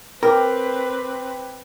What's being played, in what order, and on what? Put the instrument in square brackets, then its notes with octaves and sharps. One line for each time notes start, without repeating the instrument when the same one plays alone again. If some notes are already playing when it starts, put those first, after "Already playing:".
[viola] C4 B4 [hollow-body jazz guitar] A#4 [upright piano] G5 D6